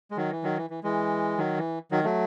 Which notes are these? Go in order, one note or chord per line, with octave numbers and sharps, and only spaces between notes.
G#3
D#3 F#3
E3
D#3 F#3
E3
E3
E3 G#3
D#3 F#3
E3
D#3 F#3
F#3 A3